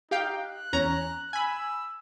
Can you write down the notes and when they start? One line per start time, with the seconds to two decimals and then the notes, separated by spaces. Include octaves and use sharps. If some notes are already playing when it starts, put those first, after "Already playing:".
0.11 D#4 G4 F5 G5
0.41 F#6
0.73 E2 C#4 A#5
1.33 G#5 B5 E6